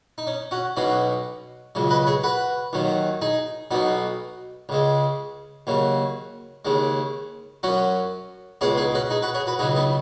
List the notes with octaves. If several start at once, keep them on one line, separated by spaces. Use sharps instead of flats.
D#4
C#4
C#4 F#4
B1 B2 F#3 C#4 F#4
C#2 C#3 F#3
B4 D#5
G#4 C#5
F#4 B4
D#2 D#3 F#3
D#4 G#4
B1 B2 F#3 B3 D#4
C#2 C#3 G#3
D#2 C#3 F#3
D#2 C#3 G#3
F#2 F#3 C#4 F#4
C#2 B2 G#3 G#4 C#5
D#4 G#4
C#4 F#4
D#4 G#4
F#4 B4
G#4 C#5
F#4 B4
C#2 C#3 F#3 D#4 G#4
B3 D#4